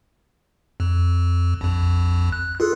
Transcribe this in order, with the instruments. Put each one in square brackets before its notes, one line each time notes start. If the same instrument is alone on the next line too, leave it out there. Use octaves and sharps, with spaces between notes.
[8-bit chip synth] F2
A#1 F2
F#6
F4 G#4 A4